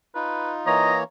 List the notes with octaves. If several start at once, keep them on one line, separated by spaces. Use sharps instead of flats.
D#4 F4 B4
E3 A#3 C#5 D#5 A#5